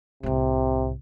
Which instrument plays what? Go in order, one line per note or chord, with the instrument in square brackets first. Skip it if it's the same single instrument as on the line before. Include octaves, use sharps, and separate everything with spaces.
[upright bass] C2 A2 [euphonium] C3